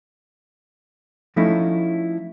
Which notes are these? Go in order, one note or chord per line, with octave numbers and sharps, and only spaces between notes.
F3 A3 C#4 D#4 E4